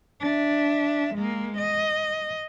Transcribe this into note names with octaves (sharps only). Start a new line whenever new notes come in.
D4 E5
G#3 A#3
D#5